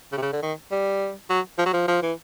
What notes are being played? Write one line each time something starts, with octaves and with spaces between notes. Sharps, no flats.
C#3
C3
C#3
D3
D#3
G3
F#3
F3
F#3
F3
F3
E3